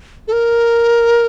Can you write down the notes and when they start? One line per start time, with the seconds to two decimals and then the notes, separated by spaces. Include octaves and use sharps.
0.28 A4
0.33 A#4